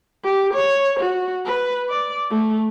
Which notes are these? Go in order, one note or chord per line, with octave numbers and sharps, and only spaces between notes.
G4
C#5
F#4
B4
D5
A3